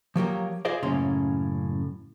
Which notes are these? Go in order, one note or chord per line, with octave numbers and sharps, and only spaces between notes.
F3 F#3 A#3 G4
F4 G#4 C5 D5 D#5 F5
F#2 A2 C#3 A#3 C#4 C6